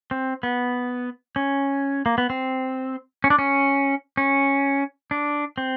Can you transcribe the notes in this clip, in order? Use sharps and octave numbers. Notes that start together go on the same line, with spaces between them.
C4
B3
C#4
A#3
B3
C4
C#4
D4
C#4
C#4
D4
C4